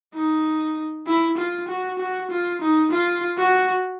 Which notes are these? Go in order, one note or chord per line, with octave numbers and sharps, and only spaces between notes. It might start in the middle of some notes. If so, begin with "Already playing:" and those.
D#4
E4
F4
F#4
F#4
F4
D#4
F4
F#4